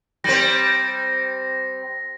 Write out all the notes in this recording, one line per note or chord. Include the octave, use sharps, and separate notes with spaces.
G3 C4 A#6